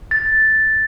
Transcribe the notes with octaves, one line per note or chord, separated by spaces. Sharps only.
A6